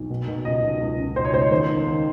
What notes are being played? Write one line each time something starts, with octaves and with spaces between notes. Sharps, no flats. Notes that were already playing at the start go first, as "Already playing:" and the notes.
Already playing: B1
B2
B2
C#2 D#5
B2
C#2
C#2
B2 C5
C#5
C#2 C5
C#5
D#2 C5
D#3
D#3